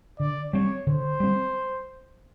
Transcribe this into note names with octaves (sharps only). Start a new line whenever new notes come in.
D3 D5
G3 C4 C#5
D3 C5
G3 C4